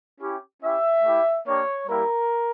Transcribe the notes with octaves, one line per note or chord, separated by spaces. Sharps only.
C#4 E4 G4
C#4 E4 G4 E5
A3 E4 G4
A#3 D4 G4 C#5
G3 A#3 E4 G4 A#4